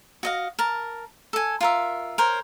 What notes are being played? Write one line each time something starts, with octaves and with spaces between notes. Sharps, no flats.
F#4 D#5 F5
A#4 A5
A4 G#5
F4 A#4 E5
A#4 C5 C#5